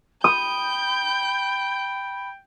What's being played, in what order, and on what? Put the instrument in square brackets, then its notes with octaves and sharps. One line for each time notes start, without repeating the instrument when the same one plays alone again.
[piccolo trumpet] G5 [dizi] B5 [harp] D#6 [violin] G6